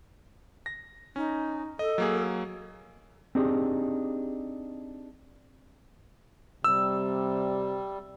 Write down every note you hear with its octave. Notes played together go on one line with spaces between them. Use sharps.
A#6
C#4 D#4
A4 D#5
F#3 A#3 G#4
C4 D4 D#4 G4 G#4
C3 G3 E6